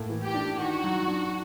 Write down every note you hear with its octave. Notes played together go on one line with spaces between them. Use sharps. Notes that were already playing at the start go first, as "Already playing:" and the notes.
Already playing: A2 A#3
E3
G4
D4
D#3 F#4
F#3
D4